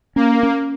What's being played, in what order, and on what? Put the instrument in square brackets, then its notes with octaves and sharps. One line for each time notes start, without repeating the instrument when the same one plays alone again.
[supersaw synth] A#3 [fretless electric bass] C#4
[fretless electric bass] C#4